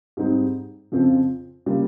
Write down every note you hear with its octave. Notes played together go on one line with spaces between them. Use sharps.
G#2 G3 C4 D#4
F2 C#3 F3 C4 F4
C#3 G3 A#3 F4